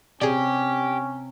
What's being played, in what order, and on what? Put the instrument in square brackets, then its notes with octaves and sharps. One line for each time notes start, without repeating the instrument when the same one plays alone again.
[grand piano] C3 [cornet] C#4 [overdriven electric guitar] G4 [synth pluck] G#4 D5